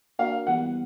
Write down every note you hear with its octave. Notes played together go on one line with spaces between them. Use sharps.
A#3 D4 F#4 A#4 F5
E3 G3 B3 F#5